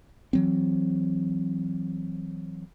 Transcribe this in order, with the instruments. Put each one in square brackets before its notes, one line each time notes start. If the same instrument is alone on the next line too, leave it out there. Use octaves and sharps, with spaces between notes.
[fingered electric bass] E3 F#3 C4